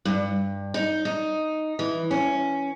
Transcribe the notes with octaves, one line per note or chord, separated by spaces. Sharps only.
G2
D#4
D#4
E3
C#4